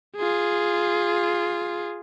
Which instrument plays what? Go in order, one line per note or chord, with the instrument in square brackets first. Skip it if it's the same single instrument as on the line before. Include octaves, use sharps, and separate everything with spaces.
[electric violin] F4 G#4